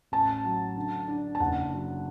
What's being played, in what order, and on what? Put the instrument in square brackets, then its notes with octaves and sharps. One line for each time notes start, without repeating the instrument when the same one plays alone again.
[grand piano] A1 [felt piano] A5
[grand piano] F#3
D3
D4
[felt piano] A5
[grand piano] F#1 [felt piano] F#5
[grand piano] F#3